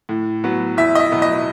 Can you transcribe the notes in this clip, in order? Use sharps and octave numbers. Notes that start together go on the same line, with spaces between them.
A2
F#3 B3
E2 E5
D#5
E5
B2 F#3 B3
D#5